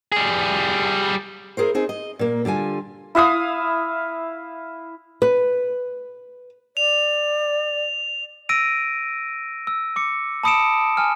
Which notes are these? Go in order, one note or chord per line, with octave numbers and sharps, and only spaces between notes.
G3 G#4
E4 G#4 A#4 C5
C4 D#4 G#4
D#5
A#2 A#3
D3 G3 F4 G#5
E4 E5 F5 D#6
B4
D5 F7
E6 A#6 D7 D#7
E6
D6 C#7
A5 B5 D#6 C#7 D7 E7
G#5 F6